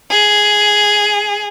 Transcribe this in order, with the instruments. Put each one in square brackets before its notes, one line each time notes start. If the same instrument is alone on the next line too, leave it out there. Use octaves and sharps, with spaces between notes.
[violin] G#4